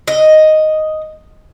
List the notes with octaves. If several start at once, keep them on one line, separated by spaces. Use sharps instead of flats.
D#5